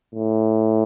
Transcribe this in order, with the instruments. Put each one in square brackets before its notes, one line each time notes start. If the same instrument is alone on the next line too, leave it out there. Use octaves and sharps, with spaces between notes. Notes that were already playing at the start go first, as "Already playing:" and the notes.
[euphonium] A2